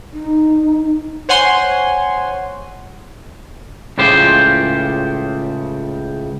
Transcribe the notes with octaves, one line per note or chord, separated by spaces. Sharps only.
D#4
C5 C#5 F#5 G#5 C6
C#2 A2 C#3 F4 G4 C5